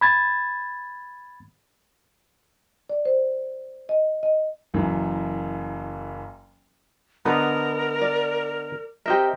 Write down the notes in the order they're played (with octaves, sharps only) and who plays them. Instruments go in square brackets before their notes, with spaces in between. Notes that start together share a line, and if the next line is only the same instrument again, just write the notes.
[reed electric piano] B5 G#6 A6
[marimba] D5
C5
D#5
D#5
[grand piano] F#1 F#2 E3
[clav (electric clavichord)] D3 B3 D#4 [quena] A#4 [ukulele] B4
[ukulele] D5
[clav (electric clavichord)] C4 D#4 A#4 [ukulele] G4 D#5 E5